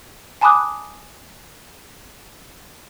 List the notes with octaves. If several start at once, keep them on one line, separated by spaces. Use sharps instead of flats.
G#5 A5 B5 D6 D#6 F#6